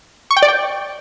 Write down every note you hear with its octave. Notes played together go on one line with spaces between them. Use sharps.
C#6
G5
D5
G5